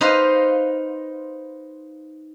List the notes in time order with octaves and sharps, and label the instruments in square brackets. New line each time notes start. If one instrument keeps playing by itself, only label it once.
[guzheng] D#4 B4 C5 D#5 F5